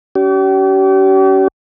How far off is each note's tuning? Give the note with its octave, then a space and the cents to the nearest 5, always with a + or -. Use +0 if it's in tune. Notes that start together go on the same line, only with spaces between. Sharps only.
C#4 +40 G4 -40